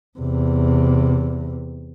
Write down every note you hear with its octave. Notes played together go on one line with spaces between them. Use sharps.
E2 C3